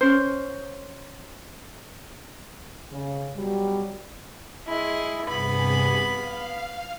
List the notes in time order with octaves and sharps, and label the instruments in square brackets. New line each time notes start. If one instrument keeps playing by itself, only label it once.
[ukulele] C#4 C5
[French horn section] C#3
B2 F#3 G3
[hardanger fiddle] G#3 E4
[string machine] G2 C3 G#4 [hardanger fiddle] B3 B5
[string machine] F5